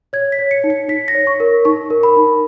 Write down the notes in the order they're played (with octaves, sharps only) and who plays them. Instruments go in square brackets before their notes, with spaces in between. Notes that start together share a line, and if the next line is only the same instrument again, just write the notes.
[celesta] C#5 G#6
B6
C#5
C#7
D#4
C#7
D#4 B6
A#6
C#5
C#6
A#4
D#4 C#6
A#4
B5
D#4